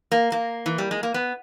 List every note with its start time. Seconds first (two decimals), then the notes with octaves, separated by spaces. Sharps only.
0.12 A#3
0.32 A#3
0.66 E3
0.78 G3
0.91 G#3
1.03 A#3
1.14 B3